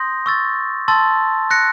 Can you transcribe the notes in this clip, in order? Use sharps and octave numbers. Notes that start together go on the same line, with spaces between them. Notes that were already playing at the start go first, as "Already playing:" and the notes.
Already playing: C6 D#6 G6 A#6
C#6 E6 A6
A5 C6 E6 A6
F#6 A#6 C#7